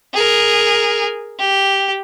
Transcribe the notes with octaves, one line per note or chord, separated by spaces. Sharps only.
G#4 A#4
G4